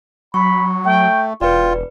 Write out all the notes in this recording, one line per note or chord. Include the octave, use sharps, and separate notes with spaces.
F#3 B5 C#6
A3 G5
E1 F4 B4 D5 G5